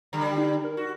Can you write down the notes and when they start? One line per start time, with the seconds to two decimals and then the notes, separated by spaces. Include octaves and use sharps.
0.13 D3 G3 A#5
0.25 G5
0.38 D#4
0.64 A#4
0.77 F#4